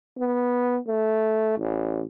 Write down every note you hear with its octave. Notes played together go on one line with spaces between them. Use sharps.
B3
A3
A1